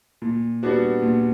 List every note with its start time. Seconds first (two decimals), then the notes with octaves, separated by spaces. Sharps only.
0.22 A#2
0.63 G3 B3 D4 F#4
1.02 A#2